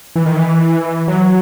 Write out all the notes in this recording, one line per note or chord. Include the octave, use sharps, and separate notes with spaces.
E3
D#3
E3
F#3